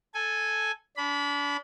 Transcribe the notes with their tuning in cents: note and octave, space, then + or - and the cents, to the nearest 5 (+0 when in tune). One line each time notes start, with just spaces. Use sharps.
A4 -10 G#5 +0
D4 -35 B5 +0